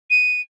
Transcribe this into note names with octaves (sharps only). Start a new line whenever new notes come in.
D#7